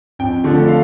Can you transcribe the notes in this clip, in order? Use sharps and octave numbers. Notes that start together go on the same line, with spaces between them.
F2 G5
D3 F3 A3
F5